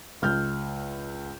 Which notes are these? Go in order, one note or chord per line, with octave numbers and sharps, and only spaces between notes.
C#2 F6 G6